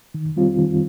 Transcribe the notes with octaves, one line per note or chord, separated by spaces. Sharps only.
D#3
G3 C4 F4
D#3